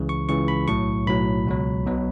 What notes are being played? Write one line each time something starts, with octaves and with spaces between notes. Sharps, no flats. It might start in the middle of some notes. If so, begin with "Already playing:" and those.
Already playing: C#2 C#3 E3
C#6
C#2 C#3 E3 C#6
B5
B1 A2 F#3 C#6
B1 A2 F#3 B5
C#2 B2 F#3
B1 B2 F#3